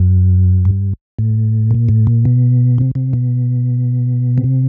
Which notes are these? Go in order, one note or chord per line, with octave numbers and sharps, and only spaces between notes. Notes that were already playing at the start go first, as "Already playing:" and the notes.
Already playing: F#2
G2
A2
A#2
A2
A#2
B2
C3
C3
B2
C3